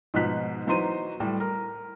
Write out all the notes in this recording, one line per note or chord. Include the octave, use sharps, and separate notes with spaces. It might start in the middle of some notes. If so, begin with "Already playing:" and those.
G#2 B2 F3 D#4 F#6 B6
E3 F#3 D#4 C5 C6 D#7
A2 G3
A#4